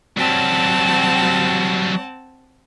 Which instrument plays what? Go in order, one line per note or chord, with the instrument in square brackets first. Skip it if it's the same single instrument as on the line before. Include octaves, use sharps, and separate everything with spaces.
[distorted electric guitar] F#3 G3 [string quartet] C4 F#5 A5